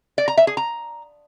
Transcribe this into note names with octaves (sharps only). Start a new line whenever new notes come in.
D5
A#5
E5
G#4
A#5